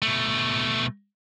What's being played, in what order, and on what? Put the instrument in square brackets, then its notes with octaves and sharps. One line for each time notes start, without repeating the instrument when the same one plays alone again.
[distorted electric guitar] B2 A3